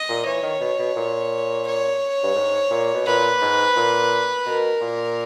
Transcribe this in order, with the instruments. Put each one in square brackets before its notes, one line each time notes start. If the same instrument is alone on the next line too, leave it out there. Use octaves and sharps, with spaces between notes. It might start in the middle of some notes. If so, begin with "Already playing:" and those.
Already playing: [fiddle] D#5
[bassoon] A#2
[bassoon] E3 [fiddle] C#5
[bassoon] D#3
B2
B2
A#2
[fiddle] C#5
[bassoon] G2
G#2
A#2
B2
[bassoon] A#2 [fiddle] B4
[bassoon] G#2
A#2
[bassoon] B2 [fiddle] A#4
[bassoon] A#2